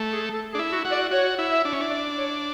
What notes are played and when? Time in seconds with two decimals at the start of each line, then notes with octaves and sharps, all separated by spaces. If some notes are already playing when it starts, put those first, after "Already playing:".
Already playing: A3
0.13 G#4
0.33 A4
0.53 D4 G#4
0.59 E4
0.72 F#4
0.85 F#4
0.92 D5
1.11 F#4 C#5
1.39 E4
1.51 E5
1.65 D4
1.72 C#4
1.81 D4
1.91 D5
2.17 C#5